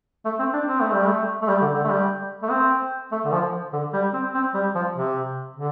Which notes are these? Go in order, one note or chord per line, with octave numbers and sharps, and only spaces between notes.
A3
C4
D4
C4
A3
G3
A3
A3
G3
D3
D3
A3
G3
A3
C4
A3
D3
F3
D3
G3
C4
C4
G3
F3
C3
D3